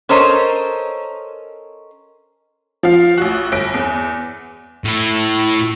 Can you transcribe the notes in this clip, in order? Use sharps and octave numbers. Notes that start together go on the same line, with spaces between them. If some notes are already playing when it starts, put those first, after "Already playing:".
C#4 A4 A#4 C5 C#5 D#5
F3 F5
A1 F#4
G1 D7
E2
A2 E4